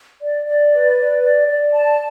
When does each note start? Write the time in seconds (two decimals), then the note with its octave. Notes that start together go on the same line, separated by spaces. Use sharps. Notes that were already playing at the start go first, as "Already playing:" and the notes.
0.22 D5
0.47 D5
0.72 B4
0.97 D5
1.23 D5
1.48 D5
1.73 A5